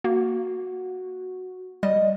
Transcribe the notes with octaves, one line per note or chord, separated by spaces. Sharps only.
A#3 F#4
G3 D#5